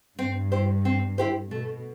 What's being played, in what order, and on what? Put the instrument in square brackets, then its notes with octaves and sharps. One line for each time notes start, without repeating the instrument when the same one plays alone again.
[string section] G2 [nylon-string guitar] C4
[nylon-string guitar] E4 G4 C5
C4
E4 G4 C5
[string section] B2 [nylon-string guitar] A3